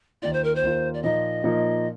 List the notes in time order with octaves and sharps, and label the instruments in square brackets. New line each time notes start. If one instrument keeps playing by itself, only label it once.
[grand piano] D#2 D#3 A#3 F4 [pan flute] D5
[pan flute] C5
A#4
C5
[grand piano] D#2 D#3 A#3 F4
[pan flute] D5
[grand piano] A#2 F3 A#3 D#4 [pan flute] D#5
[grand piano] A#2 F3 A#3 D#4